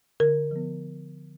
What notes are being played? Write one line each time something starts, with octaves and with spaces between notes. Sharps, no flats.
D3 A#4
F3 B3